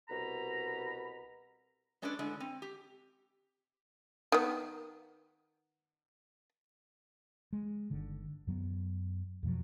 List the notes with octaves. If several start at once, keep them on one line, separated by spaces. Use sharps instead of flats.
C2 B2 A#5 B5
G#3 C#4 D4 A4 B4 D5
A2 D3 G#3
C4
G4
D#3 B3
G#3
G1 D3 D#3
F#2 F#3 A3 B3
F2 B2 F3 F#3